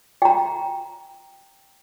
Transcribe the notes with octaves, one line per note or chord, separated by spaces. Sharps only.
G5 A#5